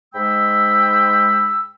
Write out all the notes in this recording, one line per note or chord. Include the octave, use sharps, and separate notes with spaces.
G#2 G#3 G5 B5 E6